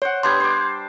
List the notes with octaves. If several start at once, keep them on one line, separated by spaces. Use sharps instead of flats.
C5 C#5 F#5
G3 B3 D4 C6 G6 G#6
C5 D6